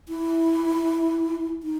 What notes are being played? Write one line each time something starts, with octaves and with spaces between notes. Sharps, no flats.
E4
D#4